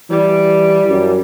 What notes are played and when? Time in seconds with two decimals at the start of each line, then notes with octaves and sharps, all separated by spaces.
0.10 E3 G3
0.89 F#2